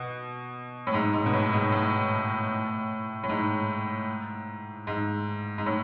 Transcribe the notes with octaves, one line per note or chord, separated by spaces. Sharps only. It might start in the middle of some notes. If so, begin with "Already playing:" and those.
Already playing: B2
A2
G#2
G#2
B2
A2
G#2
A2
A2
G#2
G#2
G#2
A2